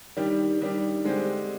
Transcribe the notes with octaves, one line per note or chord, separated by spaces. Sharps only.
D#3 G3 D4 G4
D#3 G3 D4 G4
D3 G#3 C4 G4